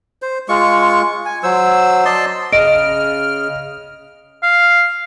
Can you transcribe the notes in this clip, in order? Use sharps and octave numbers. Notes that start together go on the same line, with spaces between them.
C5
G#3 F4 C#6
G#5
F#3 C5 E6
D5 D#5 A5 C6
C#3 D#5 F6 D7
F5